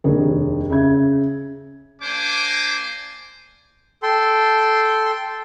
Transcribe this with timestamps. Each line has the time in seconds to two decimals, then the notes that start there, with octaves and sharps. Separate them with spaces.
0.04 F1 D#2 D4 G#4 A#4
0.70 C#3 E5 G#6
2.02 A#3 D4 C5 G#5 D6
4.03 A4 G5 C6